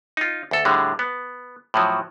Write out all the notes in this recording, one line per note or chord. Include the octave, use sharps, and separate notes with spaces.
D#4 F4
D2 A4
A2 D3 G3 G#3
B3
A2 F3 F#3